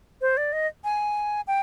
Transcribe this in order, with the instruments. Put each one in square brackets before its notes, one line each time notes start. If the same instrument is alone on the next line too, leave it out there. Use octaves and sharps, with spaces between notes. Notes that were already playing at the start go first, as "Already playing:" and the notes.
[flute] C5
D5
D#5
G#5
G5